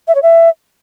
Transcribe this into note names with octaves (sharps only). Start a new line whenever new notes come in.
E5
C#5
E5